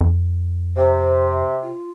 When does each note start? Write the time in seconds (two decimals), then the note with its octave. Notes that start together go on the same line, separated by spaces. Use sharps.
0.01 F2
0.77 C3 C5
1.63 F4